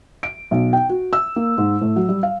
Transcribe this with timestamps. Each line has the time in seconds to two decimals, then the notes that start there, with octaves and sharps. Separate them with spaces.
0.23 D7
0.51 B1
0.73 G5
0.89 F#4
1.13 E6
1.36 A#3
1.58 G#2
1.81 A2
1.96 F#3
2.09 G3
2.23 F5